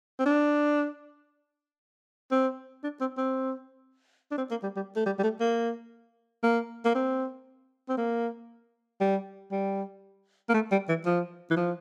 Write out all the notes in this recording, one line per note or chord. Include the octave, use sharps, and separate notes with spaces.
C4
D4
C4
D4
C4
C4
D4
C4
A#3
G3
G3
A3
G3
G3
A3
A#3
A#3
A#3
C4
C4
A#3
G3
G3
A#3
A3
G3
E3
F3
E3
F3